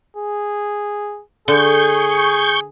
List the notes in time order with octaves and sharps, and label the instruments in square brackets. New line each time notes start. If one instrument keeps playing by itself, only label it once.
[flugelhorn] G#4
[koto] D3 [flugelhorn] G#4 [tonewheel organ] C#6 G6